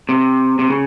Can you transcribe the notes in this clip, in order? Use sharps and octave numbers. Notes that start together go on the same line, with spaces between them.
C3
C3
C#3